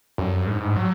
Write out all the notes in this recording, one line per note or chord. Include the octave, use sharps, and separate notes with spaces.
F#2
G#2
F#3